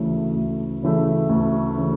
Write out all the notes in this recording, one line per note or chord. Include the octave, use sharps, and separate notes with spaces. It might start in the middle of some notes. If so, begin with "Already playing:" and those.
Already playing: D2 C#3 E3 A3
D2
C#3 E3 A3
D2
C#3 E3 A3